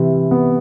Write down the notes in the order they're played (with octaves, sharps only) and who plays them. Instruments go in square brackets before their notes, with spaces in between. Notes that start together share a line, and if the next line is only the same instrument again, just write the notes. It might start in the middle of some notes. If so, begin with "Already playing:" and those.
Already playing: [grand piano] C3 E3
B3